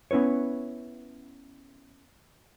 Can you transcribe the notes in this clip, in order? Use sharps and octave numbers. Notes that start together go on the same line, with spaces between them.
B3 C#4 E4 B4 C#5